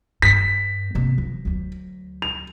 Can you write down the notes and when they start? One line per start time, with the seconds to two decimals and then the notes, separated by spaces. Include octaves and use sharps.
0.22 G2 B6
0.95 C3 A#3
1.18 F3
1.45 D2 F#3
2.22 F7